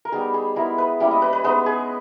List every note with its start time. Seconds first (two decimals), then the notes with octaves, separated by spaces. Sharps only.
0.05 A#4
0.12 G3 B3 D#4 G#4
0.34 G#4
0.56 G#3 B3 E4 A#4
0.78 B4
1.00 G3 A#3 C#4 E4
1.11 D#5
1.22 B4
1.33 B4
1.44 G#3 B3 D#4 B4
1.66 G#4